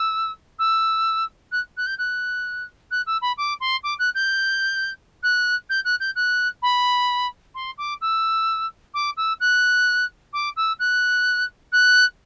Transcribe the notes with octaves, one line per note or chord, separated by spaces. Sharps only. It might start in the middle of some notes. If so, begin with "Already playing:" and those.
Already playing: E6
E6
F#6
F#6
G6
F#6
F#6
E6
B5
D6
C6
D6
F#6
G6
F#6
G6
F#6
G6
F#6
B5
C6
D6
E6
D6
E6
F#6
D6
E6
F#6
F#6